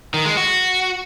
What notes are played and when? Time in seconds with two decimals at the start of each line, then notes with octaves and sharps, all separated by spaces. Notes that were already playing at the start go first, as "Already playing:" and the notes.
0.14 D#3
0.25 G#3
0.37 F#4